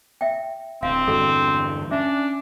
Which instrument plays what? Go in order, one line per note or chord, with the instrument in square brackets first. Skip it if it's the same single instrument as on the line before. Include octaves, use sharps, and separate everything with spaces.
[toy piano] E5 G5
[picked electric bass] D1 [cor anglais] C4 [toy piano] F5
[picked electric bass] E2 G2 D3 [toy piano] F#4 A4
[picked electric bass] C#4 [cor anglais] D4 [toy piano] E5